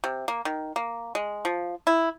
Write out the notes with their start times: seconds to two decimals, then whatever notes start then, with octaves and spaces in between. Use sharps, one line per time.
0.04 C3
0.28 A#3
0.45 D#3
0.76 A#3
1.15 G#3
1.45 F3
1.87 E4